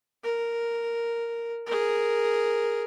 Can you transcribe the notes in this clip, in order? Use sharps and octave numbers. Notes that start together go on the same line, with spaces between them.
A#4
G#4 A#4